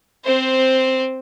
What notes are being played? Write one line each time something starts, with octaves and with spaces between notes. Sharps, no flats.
C4 C5